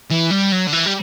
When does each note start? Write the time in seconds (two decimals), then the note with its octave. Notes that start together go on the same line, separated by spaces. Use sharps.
0.10 E3
0.31 G3
0.52 F#3
0.67 D3
0.73 E3
0.86 G3